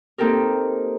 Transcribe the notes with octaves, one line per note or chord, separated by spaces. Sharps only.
A#3 C4 D#4 G4 A4 A#4